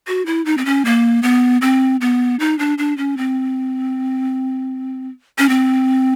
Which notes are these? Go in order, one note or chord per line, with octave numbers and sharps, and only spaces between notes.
F#4
E4
D#4
C4
C#4
A#3
B3
C4
B3
D#4
D4
D4
C#4
C4
C#4
C4